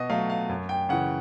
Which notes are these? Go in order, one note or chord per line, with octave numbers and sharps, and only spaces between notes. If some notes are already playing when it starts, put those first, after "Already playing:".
Already playing: B2 D#5
F#3 A3 F5
F5
F#2
G5
C#3 E3 F#5